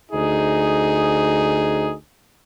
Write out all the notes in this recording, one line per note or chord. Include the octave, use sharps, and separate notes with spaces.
D2 D#4 G#4